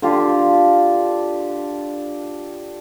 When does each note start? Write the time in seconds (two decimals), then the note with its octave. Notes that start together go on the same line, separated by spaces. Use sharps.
0.02 D3 F4 G4